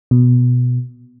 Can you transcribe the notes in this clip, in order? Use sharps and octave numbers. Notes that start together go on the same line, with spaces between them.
B2